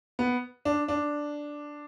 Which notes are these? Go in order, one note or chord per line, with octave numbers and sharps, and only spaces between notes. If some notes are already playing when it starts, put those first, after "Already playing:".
B3
D4
D4